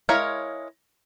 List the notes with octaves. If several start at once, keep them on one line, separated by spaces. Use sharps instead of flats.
G#3 E4 A#4 C#5 F5